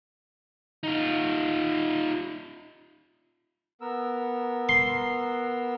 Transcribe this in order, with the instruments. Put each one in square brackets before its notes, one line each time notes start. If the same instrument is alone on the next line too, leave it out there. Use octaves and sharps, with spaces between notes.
[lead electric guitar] D#4 F4
[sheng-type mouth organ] B3 A#4 E6
[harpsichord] C6